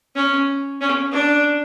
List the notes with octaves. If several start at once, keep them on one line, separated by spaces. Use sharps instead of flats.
C#4
C#4
D4